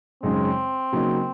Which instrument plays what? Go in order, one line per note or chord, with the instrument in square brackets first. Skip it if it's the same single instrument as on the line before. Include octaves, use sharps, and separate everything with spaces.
[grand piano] F#2 C#3 G#3 D#4 [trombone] C4
[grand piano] C#3 F#3 A#3 D#4